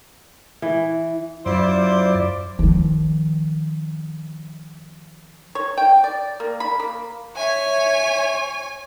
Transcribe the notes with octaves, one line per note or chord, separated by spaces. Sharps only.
E3
F#2 E4 F4 C5 D5
D#3 F3
C#5
G5
D5
A#3
B5
A#3
C#5 E5 G#5